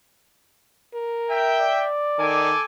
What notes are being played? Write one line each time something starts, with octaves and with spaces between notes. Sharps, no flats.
A#4
E5 G5
D5
D#3 A4 G#5 D6